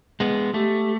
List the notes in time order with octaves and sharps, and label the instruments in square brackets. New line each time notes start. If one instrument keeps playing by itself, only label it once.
[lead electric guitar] G#3 B3
[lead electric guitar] A3 [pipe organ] G4